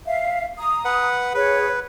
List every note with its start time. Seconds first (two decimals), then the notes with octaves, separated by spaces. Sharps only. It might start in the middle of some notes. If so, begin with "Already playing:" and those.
0.06 E5 F5
0.58 A#5 D#6
0.85 B4 F#5
1.34 G#4 B4 C#5